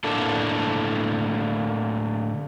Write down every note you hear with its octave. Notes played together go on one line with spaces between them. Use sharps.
A2 D3 A3 A#3 D4 A4